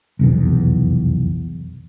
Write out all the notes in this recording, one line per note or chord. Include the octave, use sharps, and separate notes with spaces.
F1 B1 E2